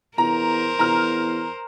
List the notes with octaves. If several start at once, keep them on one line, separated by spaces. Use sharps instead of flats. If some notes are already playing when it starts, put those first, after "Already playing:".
E2 A#4 C5 A#5
E2 A#5 F6